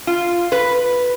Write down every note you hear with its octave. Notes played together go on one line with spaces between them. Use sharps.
F4
B4